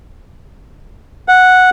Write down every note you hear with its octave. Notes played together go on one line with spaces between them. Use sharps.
F#5